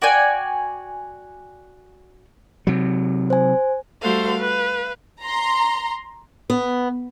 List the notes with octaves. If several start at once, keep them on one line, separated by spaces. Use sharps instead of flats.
F#4 D5 G5 G#5
C3 F#3
C5 G#5
G3 A3 F#4 A4 C5 F5
B4 F5
A#5 C6
B3